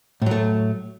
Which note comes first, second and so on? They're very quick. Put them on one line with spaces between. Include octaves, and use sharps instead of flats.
A2 F#3 A3